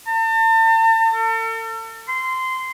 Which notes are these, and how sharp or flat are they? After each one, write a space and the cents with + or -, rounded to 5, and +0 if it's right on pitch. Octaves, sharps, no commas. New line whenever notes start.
A5 +40
A4 +45
C6 -15